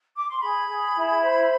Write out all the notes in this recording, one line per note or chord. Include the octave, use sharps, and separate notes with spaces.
D6
C6
G#4 B5
G#4
E4
C5